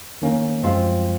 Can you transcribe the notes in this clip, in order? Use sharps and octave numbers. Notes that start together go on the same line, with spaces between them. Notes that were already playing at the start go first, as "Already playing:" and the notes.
D#3 A#3 C#4
F#2 F3 G#3 C4 F4